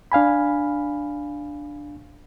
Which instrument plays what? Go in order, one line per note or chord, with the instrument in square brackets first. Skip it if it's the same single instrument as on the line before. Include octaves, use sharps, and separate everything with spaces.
[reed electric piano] D4 F5 G#5 B5